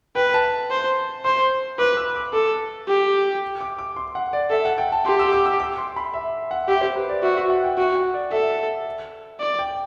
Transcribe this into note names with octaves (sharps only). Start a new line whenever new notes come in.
B4 G5
A5
C5
C5 C6
B4 D6
E6
D6
A4 D6
G4
D6
D6
C6
F#5
D5
A4 E5
F#5
G5
A5
G4 C6
E6
D6
E6
D6
C6
B5
E5
F#5
G4 E5
C5
B4
D5
F#4 E5
E5
F#5
G5
F#4 G5
F#5
D5
A4 E5
D5
G5